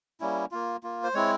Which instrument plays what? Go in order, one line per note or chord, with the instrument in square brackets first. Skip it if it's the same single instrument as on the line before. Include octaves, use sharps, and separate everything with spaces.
[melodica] G3 A#3 C#4 E4
A#3 F4
A#3 F4
C5
G#3 C4 E4 C#5